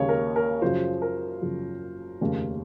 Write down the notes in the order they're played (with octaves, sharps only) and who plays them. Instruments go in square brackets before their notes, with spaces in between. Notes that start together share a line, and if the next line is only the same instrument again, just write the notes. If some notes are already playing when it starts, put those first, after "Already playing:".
Already playing: [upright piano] D#2 C#3 G#3 [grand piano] C#5
[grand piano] A#4
A#4
[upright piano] F#2 C#3 F3 [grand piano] C5
[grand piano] A#4
[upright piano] F#2 C#3 F3
F1 D#2 C#3